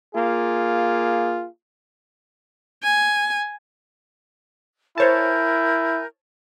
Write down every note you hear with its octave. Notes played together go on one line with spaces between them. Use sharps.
A#3 F4 G#4
G#5
E4 A#4 C5 C#5 G#5 A5 G6